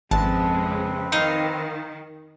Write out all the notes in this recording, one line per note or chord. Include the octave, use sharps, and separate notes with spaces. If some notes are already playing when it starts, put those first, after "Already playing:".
G#1 F2 C#3 G#3 C4 B4 A5
D#3 D#4 F5